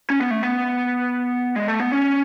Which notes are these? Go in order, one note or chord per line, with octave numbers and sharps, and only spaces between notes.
C#4
B3
A3
B3
G#3
A3
B3
C#4